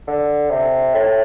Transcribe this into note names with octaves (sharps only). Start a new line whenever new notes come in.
D3
C3
A2